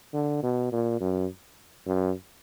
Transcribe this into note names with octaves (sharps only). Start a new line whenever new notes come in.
D3
B2
A#2
F#2
F#2